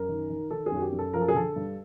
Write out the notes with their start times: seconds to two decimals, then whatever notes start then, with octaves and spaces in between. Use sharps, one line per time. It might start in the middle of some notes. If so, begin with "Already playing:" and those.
Already playing: F#2 A#4
0.09 D#3
0.30 D#3
0.50 D#3 A4
0.66 G#4
0.72 F#2 F#4
0.82 G4
0.92 F#2
0.99 A4
1.13 F3 A#4
1.21 A4
1.28 G#4
1.35 D3 A4
1.56 G2